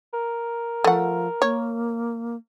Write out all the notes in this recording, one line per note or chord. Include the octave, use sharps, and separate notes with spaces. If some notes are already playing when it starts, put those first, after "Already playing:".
A#4
F3 A3 F#5
A#3 C#5